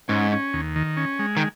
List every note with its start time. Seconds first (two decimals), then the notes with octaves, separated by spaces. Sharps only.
0.09 G#2 C#4
0.32 C#4
0.53 D#2
0.76 D#3
0.97 C#4
1.19 G#3
1.37 D#3